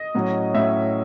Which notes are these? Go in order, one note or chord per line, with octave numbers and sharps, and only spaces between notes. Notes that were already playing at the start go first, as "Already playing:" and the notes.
Already playing: D#5
A2 F#3 C#4
A2 F#3 C#4 E5